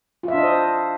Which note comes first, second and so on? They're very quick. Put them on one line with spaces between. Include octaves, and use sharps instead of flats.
F4 E5 D4 D#5 C5